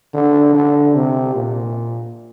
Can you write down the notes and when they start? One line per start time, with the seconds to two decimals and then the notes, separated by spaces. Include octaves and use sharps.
0.14 D3
0.54 D3
0.95 C3
1.35 A#2